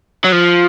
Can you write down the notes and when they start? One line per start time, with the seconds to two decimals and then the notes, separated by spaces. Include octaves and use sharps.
0.24 F#3
0.32 F3